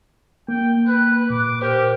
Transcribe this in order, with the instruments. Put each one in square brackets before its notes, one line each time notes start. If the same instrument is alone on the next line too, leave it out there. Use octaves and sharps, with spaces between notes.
[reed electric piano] A#3 [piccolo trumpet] G5
[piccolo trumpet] B4 [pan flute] F#6
[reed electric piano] A#2 [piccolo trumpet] D6
[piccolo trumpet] G4 [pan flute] A#4 [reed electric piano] C5